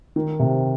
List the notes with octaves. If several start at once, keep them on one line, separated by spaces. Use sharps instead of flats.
D#3
C3